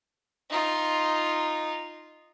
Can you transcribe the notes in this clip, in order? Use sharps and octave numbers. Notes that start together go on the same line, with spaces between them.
D#4 F4